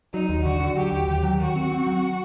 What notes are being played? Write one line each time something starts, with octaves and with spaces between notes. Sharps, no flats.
F#3 D#4
D#2
D3 F#4
D3
F#3 G4
D#2
D#2
F#3
D#3 F#4
C4
C4
F#3